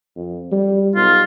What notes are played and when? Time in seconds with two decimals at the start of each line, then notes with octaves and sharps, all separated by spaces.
0.16 F2
0.52 G3
0.96 B1 F4